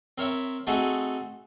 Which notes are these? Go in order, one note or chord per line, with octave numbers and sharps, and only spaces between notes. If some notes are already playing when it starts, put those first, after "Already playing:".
C4 A#4 C#5 E5 B5
A3 C4 D#4 F#4 G#4